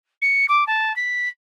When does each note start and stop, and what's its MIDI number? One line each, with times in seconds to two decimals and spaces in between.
0.22 0.46 97
0.48 0.67 86
0.67 0.95 81
0.96 1.29 95